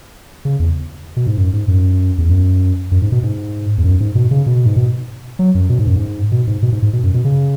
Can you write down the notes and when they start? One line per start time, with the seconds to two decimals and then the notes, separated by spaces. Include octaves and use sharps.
0.45 C#3
0.60 E2
1.17 B2
1.27 G#2
1.37 F#2
1.53 G#2
1.68 F#2
2.18 E2
2.29 F#2
2.91 F#2
3.02 G#2
3.12 B2
3.23 G#2
3.78 E2
3.84 F#2
4.00 G#2
4.15 B2
4.31 C#3
4.46 B2
4.66 G#2
4.76 B2
5.39 F#3
5.55 F#2
5.69 B2
5.79 G#2
5.87 F#2
5.96 G#2
6.32 B2
6.47 G#2
6.62 B2
6.72 G#2
6.82 G#2
6.93 B2
7.03 F#2
7.14 B2
7.24 C#3